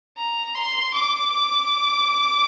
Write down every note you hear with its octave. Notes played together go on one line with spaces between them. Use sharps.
A#5
C6
D6